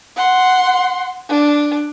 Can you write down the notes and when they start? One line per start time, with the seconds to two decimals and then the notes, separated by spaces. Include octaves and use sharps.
0.16 F#5 C6
1.29 D4